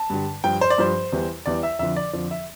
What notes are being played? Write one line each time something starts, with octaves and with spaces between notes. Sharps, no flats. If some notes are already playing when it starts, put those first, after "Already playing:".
Already playing: A5
G2 D3 G3
G2 F3 G5
C5
D5
G2 F3 C5
E2 E3 G3
E2 E3 G3 D5
E5
F2 D3 F3 E5
D5
F2 D3 F3 D5
E5